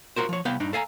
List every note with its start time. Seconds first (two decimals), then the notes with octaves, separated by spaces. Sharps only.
0.16 F4 F#4 A#4 C5
0.29 F3 C#5
0.45 C2 B3 F5 G5
0.60 G2 D4 D#4
0.73 A4 F5 G#5 A#5